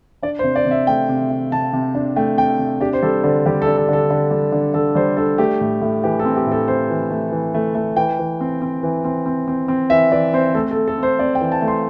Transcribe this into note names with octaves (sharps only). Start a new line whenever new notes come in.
D4 D5
C5
C3
D5
C3
E5
A3 G5
C3
C3
C3 A5
C3
D4
A3 G5
C3 G5
C3
D4 G4
C5
G3 A4
D3 C5
G3 G4
A4
D4
A4
D3 A4
D3
G3
D3
D3 A4
G3 C5
D4 A4
A3 G4
A2
A2
E3 G4
A4
C4
G4
A2
A4
C4 C5
E3
A3
E3
A3
A3
E3 G5
E3
C4
C4
E3
C4
C4
C4
C4
E3 E5
E3 D5
C4 C5
A3 A4
A4
A3
A4
C4
C5
C4 D5
G5
E3
A5
A3
C6